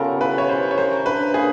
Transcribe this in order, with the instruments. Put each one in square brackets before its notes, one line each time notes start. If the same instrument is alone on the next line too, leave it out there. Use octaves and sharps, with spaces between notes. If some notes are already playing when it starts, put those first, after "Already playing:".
Already playing: [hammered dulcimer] C#3 G3 B3 F4 [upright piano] A4 A#4
[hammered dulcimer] E3 [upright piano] B4
[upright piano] C#5
[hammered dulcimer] C#3 [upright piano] C5
[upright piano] C#5
[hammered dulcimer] A#4 [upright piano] C5
[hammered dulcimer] D4 [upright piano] B4
[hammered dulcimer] A#3 [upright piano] G#4